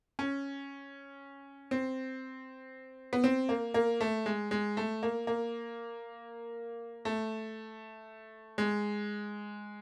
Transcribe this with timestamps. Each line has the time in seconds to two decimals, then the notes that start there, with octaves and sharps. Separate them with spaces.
0.19 C#4
1.71 C4
3.13 B3
3.24 C4
3.49 A#3
3.74 A#3
4.01 A3
4.26 G#3
4.51 G#3
4.77 A3
5.03 A#3
5.27 A#3
7.05 A3
8.58 G#3